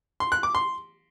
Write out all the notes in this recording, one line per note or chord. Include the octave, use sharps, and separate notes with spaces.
C6
F#6
D6
C6